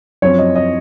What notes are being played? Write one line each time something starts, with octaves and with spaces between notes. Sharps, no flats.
F#2 F3 C4 C#5
D#5
D#5